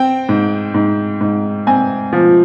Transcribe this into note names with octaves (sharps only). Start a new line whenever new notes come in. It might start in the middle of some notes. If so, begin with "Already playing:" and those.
Already playing: C4 G5
G#2
G#2
G#2
C4 G#5
F3